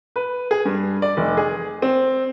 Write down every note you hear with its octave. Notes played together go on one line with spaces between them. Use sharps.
B4
G#4
G2
D5
F1
G#4
C4